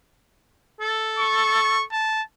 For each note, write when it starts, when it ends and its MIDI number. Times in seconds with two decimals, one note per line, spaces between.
0.81 1.84 69
1.19 1.85 85
1.92 2.22 81